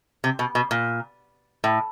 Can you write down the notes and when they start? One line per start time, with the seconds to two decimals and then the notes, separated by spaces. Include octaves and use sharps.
0.24 C3
0.39 B2
0.55 B2
0.71 A#2
1.64 A2